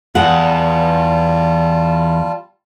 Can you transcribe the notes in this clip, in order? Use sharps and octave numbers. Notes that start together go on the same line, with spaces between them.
E2 G3 F4 F#5 A5